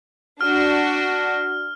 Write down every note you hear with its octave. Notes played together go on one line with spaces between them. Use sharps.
D4 F#4 F6